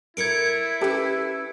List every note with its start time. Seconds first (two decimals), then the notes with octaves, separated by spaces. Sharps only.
0.17 E4 A4 A#4 D5 G#6 C#7 D7
0.81 C#4 G4 A4 B4